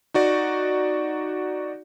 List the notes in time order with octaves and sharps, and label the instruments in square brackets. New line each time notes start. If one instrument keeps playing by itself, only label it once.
[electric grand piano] D#4 F#4 D5